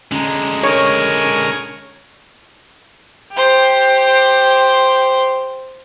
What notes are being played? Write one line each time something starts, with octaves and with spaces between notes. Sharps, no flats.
D3 G#3 C#4 A#5
A#4 C#5 G#5 C#6
G4 C5